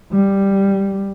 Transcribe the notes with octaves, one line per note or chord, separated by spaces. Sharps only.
G3